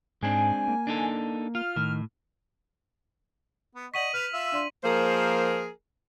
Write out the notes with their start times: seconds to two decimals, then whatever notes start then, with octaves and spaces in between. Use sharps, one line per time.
0.23 G#2 G#3 C4 D4 G#5
0.68 A#3
0.87 D4 D#4 A4
1.55 F4 F6
1.76 A2 D#3
3.75 B3
3.94 D5 D#5 F#5 C#6 B6 D#7 F#7
4.14 B4 F6 F7
4.33 F4 E5 E6
4.52 D4 D5 C6
4.84 F3 A#3 G#4 A#4 C5